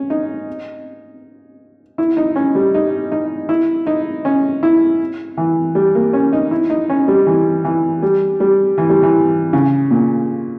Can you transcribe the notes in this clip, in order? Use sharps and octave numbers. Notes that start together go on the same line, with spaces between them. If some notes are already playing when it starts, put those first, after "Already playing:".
Already playing: C#4
D#4
E4
D#4
C#4
G3
D#4
D#4
E4
D#4
C#4
E4
E3
G3
A#3
C#4
D#4
E4
D#4
C#4
G3
E3
E3
G3
G3
E3
G3
E3
C#3
A#2